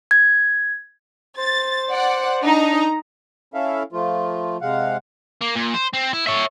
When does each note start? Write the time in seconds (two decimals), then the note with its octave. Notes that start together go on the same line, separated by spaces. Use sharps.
0.11 G#6
1.38 C5 A6
1.91 D5 F#5
2.44 D4 D#4 A#5
3.54 C#4 E4 A4 E5 F5
3.93 F3 A3 F4
4.61 C3 G#3 F5 F#5
5.41 A#3
5.55 A#2
5.74 C5
5.94 C4
6.13 E4
6.27 C#5 E5